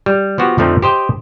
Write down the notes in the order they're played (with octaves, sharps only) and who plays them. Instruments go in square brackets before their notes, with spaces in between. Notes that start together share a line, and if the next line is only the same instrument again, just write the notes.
[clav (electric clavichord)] G3
F3 B3 F#4 G4
F2 D3 F3 A3 C4 D#4
G4 C5 D#5 G5